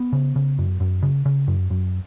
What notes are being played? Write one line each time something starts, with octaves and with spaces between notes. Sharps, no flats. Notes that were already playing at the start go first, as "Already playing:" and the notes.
Already playing: B3
C#3
C#3
F#2
F#2
C#3
C#3
F#2
F#2